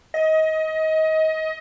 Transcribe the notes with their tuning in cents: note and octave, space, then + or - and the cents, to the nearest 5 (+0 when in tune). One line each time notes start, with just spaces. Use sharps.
D#5 +25